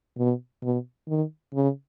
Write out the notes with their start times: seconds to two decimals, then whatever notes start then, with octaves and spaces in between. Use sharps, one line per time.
0.18 B2
0.62 B2
1.08 D#3
1.54 C#3